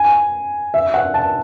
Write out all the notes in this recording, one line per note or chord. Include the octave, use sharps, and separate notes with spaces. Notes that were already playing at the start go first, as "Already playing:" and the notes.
Already playing: G#5
E5
F#5
A5